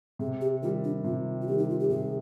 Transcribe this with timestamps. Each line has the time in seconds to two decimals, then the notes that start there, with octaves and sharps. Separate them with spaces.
0.19 C3 G#4
0.41 G4
0.62 D#3 G3 F4
0.84 D4
1.04 C3 F4
1.42 F4
1.47 D#3 G3 G4
1.58 D#4
1.70 F4
1.79 G4
1.89 C3 G#4